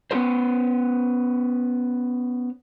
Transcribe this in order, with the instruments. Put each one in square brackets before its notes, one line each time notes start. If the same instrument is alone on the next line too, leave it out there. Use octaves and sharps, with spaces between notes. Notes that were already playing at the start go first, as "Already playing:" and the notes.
[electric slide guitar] B3 C#4 F#4 A#4 C5